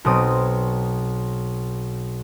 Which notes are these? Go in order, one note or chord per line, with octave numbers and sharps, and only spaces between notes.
B1 B2 C4 D#6